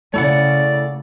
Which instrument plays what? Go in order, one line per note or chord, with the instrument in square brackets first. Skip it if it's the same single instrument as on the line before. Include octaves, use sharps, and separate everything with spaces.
[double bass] C#3 [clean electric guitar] A3 E4 F#5 [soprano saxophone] D5